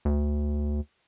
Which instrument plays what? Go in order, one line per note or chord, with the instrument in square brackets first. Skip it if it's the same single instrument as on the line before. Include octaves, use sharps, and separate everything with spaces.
[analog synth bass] D2